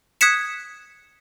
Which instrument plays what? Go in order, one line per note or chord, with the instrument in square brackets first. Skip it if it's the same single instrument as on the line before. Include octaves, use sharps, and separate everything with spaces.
[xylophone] D#6 F#6 G#6 B6 C#7 E7